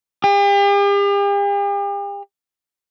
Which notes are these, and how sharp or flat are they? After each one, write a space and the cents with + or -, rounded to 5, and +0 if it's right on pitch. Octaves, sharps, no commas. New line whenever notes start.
G4 +45